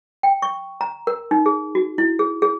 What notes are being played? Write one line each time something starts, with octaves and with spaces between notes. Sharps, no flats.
G5
C#6
A#5
A#4
D#4
G#4
F#4
E4
G#4
G#4